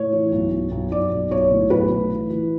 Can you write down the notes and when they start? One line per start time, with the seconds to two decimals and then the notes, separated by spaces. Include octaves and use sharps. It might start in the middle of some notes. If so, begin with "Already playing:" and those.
Already playing: A2 C#5
0.13 E3
0.32 B1
0.52 B1
0.71 B1
0.91 B1 D5
1.11 B1
1.31 B1 C#5
1.51 A2
1.70 B1 B4
1.90 A2
2.10 E3
2.30 E3